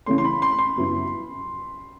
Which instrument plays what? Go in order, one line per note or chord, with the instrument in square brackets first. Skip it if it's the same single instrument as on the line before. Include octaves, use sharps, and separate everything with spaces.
[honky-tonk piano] C#3 E3 A3 C#4 [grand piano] C6
[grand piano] C6
B5
C6
B5
C6
[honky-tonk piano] F#2 C#3 F#3 B3 E4